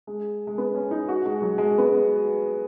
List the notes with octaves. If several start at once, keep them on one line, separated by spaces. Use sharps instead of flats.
G#3
G#3
B3
C#4
D#4
F#4
G#3
F#3
G#3
B3
G#3